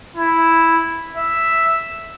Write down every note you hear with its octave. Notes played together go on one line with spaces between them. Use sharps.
E4
E5